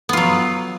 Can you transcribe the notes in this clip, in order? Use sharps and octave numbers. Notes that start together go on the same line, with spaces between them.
F#3 B3 F4